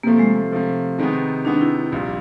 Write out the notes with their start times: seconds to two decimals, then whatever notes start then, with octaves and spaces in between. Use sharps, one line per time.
0.03 C3 F3 A3 A#3
0.19 G#3
0.52 C3 F3 A3
0.99 C3 D#3 G#3 B3
1.45 C3 D#3 G#3 B3 D4
1.61 E4
1.92 A#1 A#2 G3